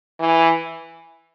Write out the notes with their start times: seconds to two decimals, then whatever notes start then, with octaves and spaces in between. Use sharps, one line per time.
0.20 E3